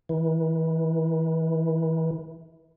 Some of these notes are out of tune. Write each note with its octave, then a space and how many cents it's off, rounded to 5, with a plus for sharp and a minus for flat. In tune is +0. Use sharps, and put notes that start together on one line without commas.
E3 -30